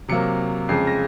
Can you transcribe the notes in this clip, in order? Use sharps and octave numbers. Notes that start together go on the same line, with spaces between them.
C3 F#3 A#3 C#7
F2 C#3 G#3 C7
A#6